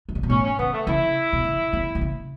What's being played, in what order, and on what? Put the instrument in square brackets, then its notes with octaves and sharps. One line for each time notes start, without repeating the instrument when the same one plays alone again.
[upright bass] E3
C#3
B2
[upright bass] A2 [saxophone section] C#4
[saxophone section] C#4
[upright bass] C#3 [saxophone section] B3
[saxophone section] A3
[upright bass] C#3 [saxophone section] E4
[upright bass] B2
C#3
C#3
B2
C#3